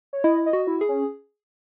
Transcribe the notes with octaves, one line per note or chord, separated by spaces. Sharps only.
C#5
E4 D#5
D#5
F#4
E4
G#4
C#4